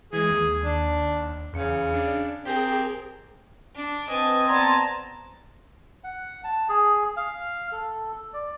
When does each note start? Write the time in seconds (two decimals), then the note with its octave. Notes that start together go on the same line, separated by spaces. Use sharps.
0.13 E3 G#3 G#4
0.30 D#2
0.62 D4
1.53 E2 C#3 C#7
1.94 D4
2.45 C4 G4 G#4 A#4
3.75 D4
4.09 C4 B4 D#5 G#5 A5
4.49 B3 D5 A5 A#5 C6 G#6
6.04 F#5
6.44 A5
6.69 G#4
7.17 F5
7.72 A4
8.34 D5